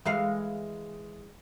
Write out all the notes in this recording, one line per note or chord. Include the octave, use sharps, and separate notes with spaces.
E3 G#3 F5